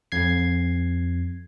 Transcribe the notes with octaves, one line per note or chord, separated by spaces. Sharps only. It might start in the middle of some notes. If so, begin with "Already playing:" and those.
F2 G#6 C7